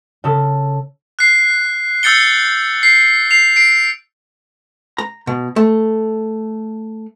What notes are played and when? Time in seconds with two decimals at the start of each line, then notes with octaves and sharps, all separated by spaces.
0.24 C#3 A4
1.19 F#6 C7
2.03 E6 G6 A6 C#7 G7
2.83 C7
3.31 C7 F7
3.56 C7 D7
4.98 A#5
5.27 B2
5.56 A3